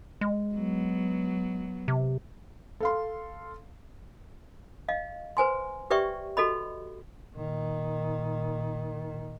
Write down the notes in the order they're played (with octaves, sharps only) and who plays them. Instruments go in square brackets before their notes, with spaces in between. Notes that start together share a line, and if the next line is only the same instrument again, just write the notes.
[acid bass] G#3
[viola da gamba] F#3 B3
[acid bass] C3
[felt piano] A4 F5 C6
[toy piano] D#5 F5
B4 C5 G#5 C6
G4 B4 D5 E5 G5 C#6
F#4 A4 D#5 B5
[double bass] A#2 D#3